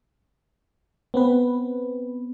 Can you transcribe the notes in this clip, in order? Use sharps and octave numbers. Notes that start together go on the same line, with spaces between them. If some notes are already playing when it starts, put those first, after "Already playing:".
B3 C4 B4